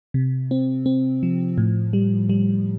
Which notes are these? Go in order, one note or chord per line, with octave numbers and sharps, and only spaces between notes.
C3
C4
C4
F3
A2
G3
G3